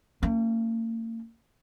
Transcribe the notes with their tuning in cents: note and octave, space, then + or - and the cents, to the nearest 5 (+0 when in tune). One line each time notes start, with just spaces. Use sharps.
A#3 -45 C#4 -5